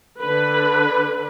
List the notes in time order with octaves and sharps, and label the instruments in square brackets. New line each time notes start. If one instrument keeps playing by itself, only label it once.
[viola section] D3 B4